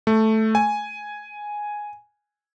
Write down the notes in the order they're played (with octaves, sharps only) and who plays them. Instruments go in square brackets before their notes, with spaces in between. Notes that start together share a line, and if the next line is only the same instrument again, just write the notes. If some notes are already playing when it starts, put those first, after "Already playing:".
[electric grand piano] A3
G#5